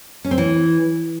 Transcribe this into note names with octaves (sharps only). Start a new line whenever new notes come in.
C#4
C4
E3